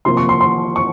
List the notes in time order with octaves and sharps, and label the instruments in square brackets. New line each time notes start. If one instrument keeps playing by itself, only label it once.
[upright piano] C3 F3 A#3 C6
C#6
C6
C6
C#6